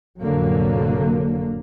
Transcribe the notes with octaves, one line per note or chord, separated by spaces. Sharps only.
F1 A2 D3 F#3 A#3